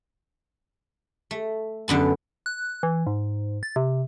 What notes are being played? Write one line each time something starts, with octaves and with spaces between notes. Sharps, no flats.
A3
F#2 D3 B3 A5
F#6
E3
G#2
A6
C3